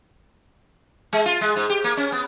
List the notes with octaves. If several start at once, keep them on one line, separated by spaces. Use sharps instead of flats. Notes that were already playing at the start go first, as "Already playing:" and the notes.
G#3
F4
G#3
G#2
G4
A#3
C#4
B3